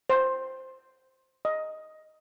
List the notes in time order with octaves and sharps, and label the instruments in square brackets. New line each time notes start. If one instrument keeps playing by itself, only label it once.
[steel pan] C5
D#5